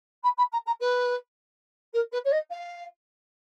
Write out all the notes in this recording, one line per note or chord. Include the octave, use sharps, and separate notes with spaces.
B5
B5
A#5
A#5
B4
A#4
B4
C#5
D#5
F5